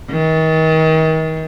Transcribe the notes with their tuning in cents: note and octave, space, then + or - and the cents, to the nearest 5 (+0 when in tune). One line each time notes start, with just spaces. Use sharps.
D#3 +35